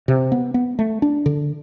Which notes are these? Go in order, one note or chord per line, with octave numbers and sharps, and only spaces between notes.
C3
B3
B3
A3
D4
D3